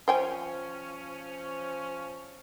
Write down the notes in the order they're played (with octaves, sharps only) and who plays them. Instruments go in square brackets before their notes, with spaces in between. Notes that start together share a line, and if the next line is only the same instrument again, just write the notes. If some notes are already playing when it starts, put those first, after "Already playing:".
[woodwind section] F3 C#4 [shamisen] C5 G5 G#5